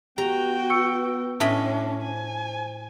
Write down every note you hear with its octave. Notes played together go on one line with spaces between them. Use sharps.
B3 F#4 G4 G5 A#5 F7
C#6 E6 C#7
A2 C#4 D4 D#5 A5 B5
C5 G#5